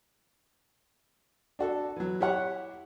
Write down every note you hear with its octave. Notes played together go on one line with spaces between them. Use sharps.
D4 F#4 A4
E3 F#3
E4 G4 C#5 F#5